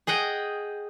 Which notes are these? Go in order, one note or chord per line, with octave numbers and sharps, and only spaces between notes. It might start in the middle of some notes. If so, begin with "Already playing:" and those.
G#4 D#5 F#5 G5